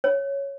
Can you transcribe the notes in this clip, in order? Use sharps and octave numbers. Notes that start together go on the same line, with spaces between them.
C#5